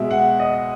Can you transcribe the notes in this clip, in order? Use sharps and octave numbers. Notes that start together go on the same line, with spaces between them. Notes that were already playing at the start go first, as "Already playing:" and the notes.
Already playing: B2 G#3 E5
F#5
D#5